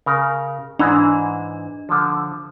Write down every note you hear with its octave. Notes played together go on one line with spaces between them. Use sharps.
C#3 A#4
G#2 E3 G#3 D4
D3 F3